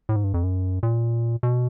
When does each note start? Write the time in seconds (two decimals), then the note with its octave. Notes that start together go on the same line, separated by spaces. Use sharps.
0.09 A2
0.16 G#2
0.24 G2
0.34 F2
0.43 F#2
0.83 A#2
1.43 B2